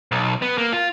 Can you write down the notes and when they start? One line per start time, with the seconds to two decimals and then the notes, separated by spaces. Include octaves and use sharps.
0.12 B1
0.42 B3
0.58 A#3
0.73 F4